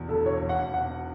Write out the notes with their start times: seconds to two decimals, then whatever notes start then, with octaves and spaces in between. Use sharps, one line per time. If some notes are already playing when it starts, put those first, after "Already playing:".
Already playing: E2 B2
0.09 E1 A4
0.26 B2 C#5
0.42 E1
0.49 F#5
0.58 E1
0.74 B2 F#5